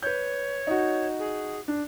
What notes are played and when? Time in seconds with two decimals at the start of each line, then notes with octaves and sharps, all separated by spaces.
0.03 B4 C#5 G6
0.67 D#4 F#4
1.19 G#4
1.68 D4